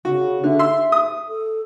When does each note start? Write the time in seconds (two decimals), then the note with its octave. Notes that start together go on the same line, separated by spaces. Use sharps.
0.05 C#3 F#4
0.44 D3 E5
0.59 C6 E6
0.92 D#6
1.28 A4